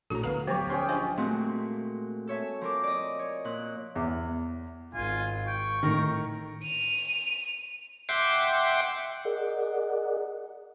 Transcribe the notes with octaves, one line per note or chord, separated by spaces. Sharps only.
A#1 A2 F#4 A4 A#5
D2 D3 B3 B4 F5 A#5
D2 F3 F#3 G4 C#5
C#4 G#4 G5 C6
D4 F4 C5 D#5
A#2 G#3 A3 C4 F#4
A4 C#5 E5 G#5
F3 A#4 D6
D5 D#5
C#5
A#2 F#6
E2
G#1 F4 G#5
G5 C#6
A2 D#3 A#4
D#7 F7
E5 F#5 G5 C6 D6
G#4 A#4 D5 D#5 F#5